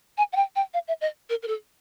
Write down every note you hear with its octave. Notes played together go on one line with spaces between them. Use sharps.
G#5
F#5
G5
G5
F5
E5
D#5
A#4
A#4
A4